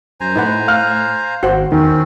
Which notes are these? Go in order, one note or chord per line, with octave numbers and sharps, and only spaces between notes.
F#2 C5 G#5 A#5
A2 D#4 B4 F#5
F5 F6 F#6
G#1 F#4 C5
E2 D#3 C4 C#4